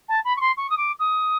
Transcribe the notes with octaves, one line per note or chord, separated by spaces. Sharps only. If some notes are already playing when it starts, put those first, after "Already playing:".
A5
B5
C#6
C6
C#6
D#6
D6
D#6